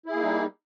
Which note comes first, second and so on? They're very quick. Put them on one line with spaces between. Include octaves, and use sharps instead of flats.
E4 G#4 A#3 D#4 G3